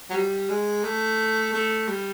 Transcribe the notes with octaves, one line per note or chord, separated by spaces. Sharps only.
F#3
G3
G#3
A3
A3
G3